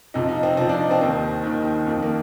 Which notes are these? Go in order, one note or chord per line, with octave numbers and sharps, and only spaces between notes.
F2 C3 F3 D#4
D#4
C4
F2 C3 F3 C4
D4
D#4
C4
D#2 D#3 C4
D#2 D#3
F2 D#3
A#3